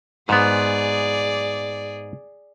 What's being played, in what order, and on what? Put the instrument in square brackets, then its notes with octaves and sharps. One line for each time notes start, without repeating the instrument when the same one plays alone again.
[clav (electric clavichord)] G#2 B3 [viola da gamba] G#4 D5